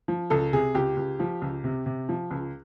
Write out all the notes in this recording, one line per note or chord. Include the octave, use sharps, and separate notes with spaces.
F3
C#2 A4
C3 G#4
C#2 G4
C#2
F3
C#2
C3
C3
F3
C#2